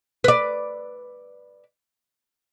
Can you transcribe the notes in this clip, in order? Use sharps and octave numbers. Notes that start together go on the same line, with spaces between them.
B4 D5